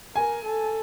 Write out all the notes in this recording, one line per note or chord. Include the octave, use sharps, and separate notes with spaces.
A#4 G#5
A4